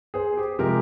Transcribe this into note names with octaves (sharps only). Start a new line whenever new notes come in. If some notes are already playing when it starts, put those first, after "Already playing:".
G#4 C5
G4
C3 F3 G#3 G4 A#4